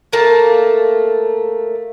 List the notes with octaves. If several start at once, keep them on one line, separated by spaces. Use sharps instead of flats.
A3 A#3 A5